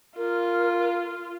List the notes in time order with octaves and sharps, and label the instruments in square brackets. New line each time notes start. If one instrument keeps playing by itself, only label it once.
[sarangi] F4 [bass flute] A#4